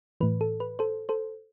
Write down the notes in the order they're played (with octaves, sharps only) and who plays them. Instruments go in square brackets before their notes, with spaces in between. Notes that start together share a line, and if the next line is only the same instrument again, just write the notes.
[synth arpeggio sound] A2 E3 B4
A4
B4
A4 C5
A4 C5